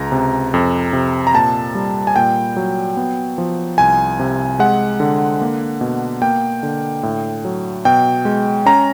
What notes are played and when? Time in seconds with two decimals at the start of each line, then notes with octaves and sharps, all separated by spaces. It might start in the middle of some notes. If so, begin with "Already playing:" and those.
Already playing: C#2 A#5
0.12 C3
0.54 F2
0.93 C3
1.27 A#5
1.34 A#2 A5
1.75 G3
2.07 G#5
2.16 A#2 G5
2.57 F#3
2.97 B3
3.38 F3
3.78 C2 G#5
4.19 C3
4.59 G#3 F#5
5.00 D3
5.41 A#3
5.81 B2
6.22 A#3 G5
6.63 D3
7.03 A2
7.45 F#3
7.85 B2 G5
8.25 G#3
8.66 C#4 A#5